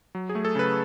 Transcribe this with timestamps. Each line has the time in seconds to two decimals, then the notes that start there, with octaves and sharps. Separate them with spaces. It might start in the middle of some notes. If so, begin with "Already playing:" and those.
0.15 F#3
0.29 G#4
0.35 A3
0.45 A4
0.55 C#3 B4